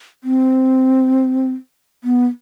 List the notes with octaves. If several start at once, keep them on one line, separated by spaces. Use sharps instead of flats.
C4
B3